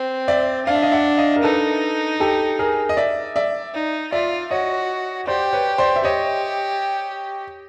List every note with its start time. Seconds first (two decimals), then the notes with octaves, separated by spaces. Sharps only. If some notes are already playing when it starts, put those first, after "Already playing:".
Already playing: C4
0.28 D5 E5
0.66 D4 F5
0.75 E5
0.82 D#5 F5
0.92 E5 F#5
1.18 D#5 F5
1.36 A#4
1.43 D#4 A4 B4
2.20 G4 A4
2.59 G#4 A#4
2.89 D#5
2.97 D5 E5
3.36 D5 E5
3.74 D#4
4.12 F4 D5 E5
4.51 F#4 C#5 D#5
5.27 G4 C5 D5
5.53 B4 C#5
5.78 C5 D5
5.96 E5
6.04 G4 C#5 D#5